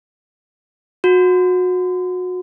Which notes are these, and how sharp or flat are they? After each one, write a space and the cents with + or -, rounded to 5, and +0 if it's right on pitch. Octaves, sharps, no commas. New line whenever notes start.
F#4 -25